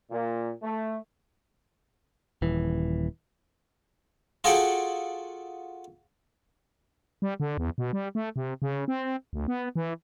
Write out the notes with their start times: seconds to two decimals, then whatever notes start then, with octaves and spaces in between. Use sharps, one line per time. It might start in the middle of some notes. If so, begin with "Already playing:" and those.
0.10 A#2
0.62 A3
2.42 D#1 E3
4.44 F4 F#4 G#4 A4 F#5 G5
7.22 G3
7.40 D3
7.57 E2
7.78 B2
7.93 G3
8.15 A3
8.36 C3
8.62 C#3
8.88 C4
9.33 D2
9.48 B3
9.76 E3